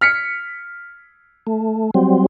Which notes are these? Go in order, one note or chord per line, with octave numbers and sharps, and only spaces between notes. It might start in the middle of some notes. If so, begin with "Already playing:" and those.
F6 B6 C#7
A3
F#3 G3 C4